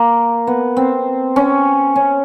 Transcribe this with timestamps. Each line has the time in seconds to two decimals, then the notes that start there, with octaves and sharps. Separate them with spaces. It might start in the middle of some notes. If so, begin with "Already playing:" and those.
Already playing: A#3
0.47 B3
0.77 C4
1.36 C#4
1.96 C#4